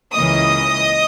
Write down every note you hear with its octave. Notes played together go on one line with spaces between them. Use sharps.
C#2 C#3 E3 A#3 D#5 D#6